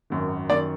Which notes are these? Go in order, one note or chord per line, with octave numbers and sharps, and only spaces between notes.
G#1 F#2 D#3
F#2 D#3 D5